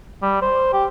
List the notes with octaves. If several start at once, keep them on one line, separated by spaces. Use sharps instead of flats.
G3
C5
G4